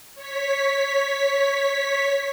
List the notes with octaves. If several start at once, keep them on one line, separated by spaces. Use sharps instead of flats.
C#5 B6